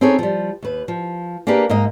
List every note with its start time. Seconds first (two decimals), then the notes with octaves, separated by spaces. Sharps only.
0.01 C4 C#4 D#4 G#4 A4 C#5
0.19 F3 G3
0.63 D#2 B4
0.88 F3
1.47 A#3 D4 G4 G#4 A#4 B4
1.70 G#2 A#3 A#4 D#5